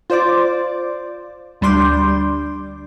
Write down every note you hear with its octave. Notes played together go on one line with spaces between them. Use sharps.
F4 C5 D5 D6
D2 G3 D4 C6 D6 G6